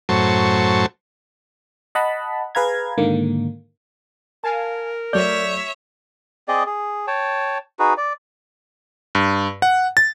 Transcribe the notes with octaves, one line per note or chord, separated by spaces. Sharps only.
F#2 A2 F#3 C5 A5 C#6
D#5 F#5 A5 B5
G#4 B4 F5 A#5 G#6
G#2 D3 D#3 A#3
A#4 F5 G#5 A5
F#3 A3 C#5 D5 E5 G6
C4 G#4 D5 D#5
G#4
C#5 G5 A5
D#4 F#4 G#4 B4
D5
G2
F#5
A6